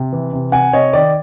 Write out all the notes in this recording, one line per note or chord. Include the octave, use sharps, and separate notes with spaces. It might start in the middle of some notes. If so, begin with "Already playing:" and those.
Already playing: C3
E3
C3
C3 F#5 G#5
C3 C#5 D#5
D#3 D5